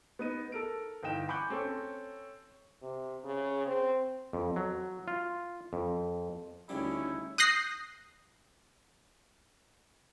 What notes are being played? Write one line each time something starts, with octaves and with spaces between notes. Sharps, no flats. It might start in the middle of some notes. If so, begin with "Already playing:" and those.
B3 D#4 D#7
A4 A#4 D7
G1 E3 D#4 G5 E7
G#5 B5 C#6 D6 F#6 G6
C4 C#4 A4 C#6
C3
C#3
C4
F2
F#3
F4
F2
D2 C#3 G3 C#4 D#4 E4
D#6 F#6 G6 A#6 C7